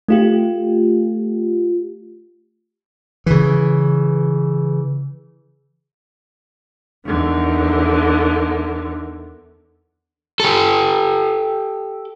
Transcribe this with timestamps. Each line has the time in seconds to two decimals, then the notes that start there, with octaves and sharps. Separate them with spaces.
0.09 A3 F4 G4
3.26 C#3 E3
7.05 E2 D3 D#3
10.40 G4 A4